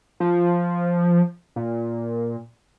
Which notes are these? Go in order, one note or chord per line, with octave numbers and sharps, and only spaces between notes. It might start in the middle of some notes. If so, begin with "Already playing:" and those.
F3
A#2